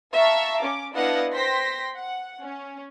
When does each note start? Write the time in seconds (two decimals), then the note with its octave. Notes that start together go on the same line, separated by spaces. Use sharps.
0.13 E5 F5 A5 A#5 C#6
0.60 C#4 D6
0.94 B3 D4 E4 D#5 F5 F#5
1.34 C5 G5 C6 A#6 B6
1.97 F#5
2.41 C#4